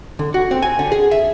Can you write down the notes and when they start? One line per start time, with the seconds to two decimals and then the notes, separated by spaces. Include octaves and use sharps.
0.19 D3
0.34 F#4
0.51 C4
0.62 G#5
0.79 D3
0.92 G#4
1.11 E5